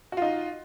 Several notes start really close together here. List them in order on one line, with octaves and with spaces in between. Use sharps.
F#4 F4 D#4